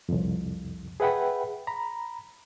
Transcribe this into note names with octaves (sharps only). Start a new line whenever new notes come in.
C2 F2
G#4 B4 E5 F#5 G5 B5
A#5 B5